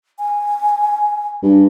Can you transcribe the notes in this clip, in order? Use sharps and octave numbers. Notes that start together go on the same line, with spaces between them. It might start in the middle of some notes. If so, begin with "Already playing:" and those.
G#5
G2